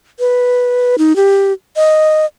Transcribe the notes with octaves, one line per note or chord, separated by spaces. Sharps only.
B4
D#4
G4
D#5